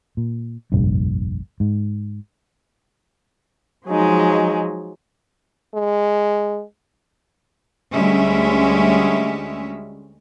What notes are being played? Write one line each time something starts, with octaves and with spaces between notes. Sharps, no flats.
A#2
F1 A#1 G2
G#2
F3 F#3 G#3 D#4
G#3
D2 G3 G#3 C#4 E5